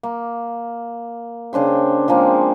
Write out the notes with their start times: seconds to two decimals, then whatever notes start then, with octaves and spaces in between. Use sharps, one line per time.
0.03 A#3
1.53 C#3 D4 C5 G5
2.08 F3 G#3 A#3 C4